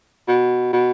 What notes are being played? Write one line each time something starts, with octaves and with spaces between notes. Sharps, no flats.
B2
B2